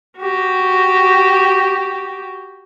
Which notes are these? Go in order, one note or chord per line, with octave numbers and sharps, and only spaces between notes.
F#4 G4